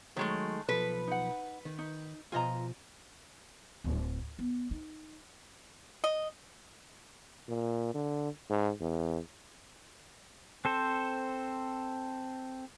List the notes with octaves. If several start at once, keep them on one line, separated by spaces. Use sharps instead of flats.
D#3 F#3 G#3 A3 C#5
B1 F3 A4 B4
D#4 F#5
D#3
D#4
B2 F3 F4 D#5 G#5 A#5
D1
B3
D#4
D#5
A#2
D3
G#2
E2
C4 A4 C5